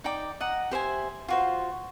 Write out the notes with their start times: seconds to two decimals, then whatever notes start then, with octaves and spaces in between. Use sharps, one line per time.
0.04 D#4 D5 G5 D6
0.40 D#5 F#5 A#5
0.71 G4 C5 E5 G#5
1.28 F4 F#4 C5